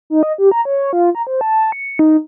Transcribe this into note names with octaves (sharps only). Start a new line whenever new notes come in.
D#4
D#5
G4
A#5
C#5
F4
A#5
C5
A5
C#7
D#4